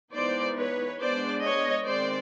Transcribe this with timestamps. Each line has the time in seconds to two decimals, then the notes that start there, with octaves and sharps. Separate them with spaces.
0.13 E3 G#3 B3 D#4 C5 D5
0.56 B4 C#5
1.00 G#3 B3 D4 C5 D5
1.43 C#5 D#5
1.85 D#3 G#3 C4 C5 D5